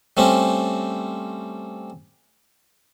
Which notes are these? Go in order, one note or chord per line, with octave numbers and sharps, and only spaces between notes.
G3 A3 C4 C#4 G4